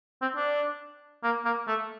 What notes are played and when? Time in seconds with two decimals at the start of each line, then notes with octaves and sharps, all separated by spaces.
0.22 C4
0.36 D4
1.24 A#3
1.45 A#3
1.68 A3